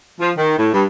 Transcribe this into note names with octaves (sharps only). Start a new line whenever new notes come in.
F3
D#3
A2
G2